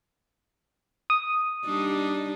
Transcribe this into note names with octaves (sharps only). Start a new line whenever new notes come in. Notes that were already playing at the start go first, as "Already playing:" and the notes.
D#6
G3 D4 D#4